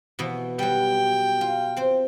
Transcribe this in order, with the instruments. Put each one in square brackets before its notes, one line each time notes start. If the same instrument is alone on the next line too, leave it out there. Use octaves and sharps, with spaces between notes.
[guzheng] B2 E3 B3
[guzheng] F#3 G3 [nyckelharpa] G5
[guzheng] F4
C4 C5